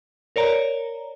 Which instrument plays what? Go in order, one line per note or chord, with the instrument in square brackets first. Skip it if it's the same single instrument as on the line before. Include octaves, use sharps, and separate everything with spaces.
[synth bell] A#4 C#5 D5 A#5